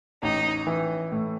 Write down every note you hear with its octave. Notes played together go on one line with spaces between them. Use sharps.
A1 D#4
E3
A2